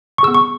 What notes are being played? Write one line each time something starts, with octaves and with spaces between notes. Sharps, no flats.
C#6
B3 G#4 E6
C#6